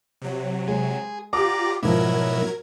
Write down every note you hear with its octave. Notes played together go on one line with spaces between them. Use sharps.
C3 F#3
G#3 G#4
F4 G4 D5 F#5 A#5 D6
G#2 B2 F3 F#3 E4 A#4 G#6